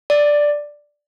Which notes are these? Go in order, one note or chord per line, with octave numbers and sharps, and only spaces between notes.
D5